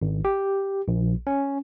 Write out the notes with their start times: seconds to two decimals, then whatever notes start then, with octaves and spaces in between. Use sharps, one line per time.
0.02 G#1
0.25 G4
0.88 A#1
1.27 C#4